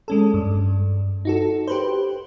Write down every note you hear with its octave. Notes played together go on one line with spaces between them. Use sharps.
G#3 C#4 A4
G2
D#4 F#4 A4
G4 B4 C5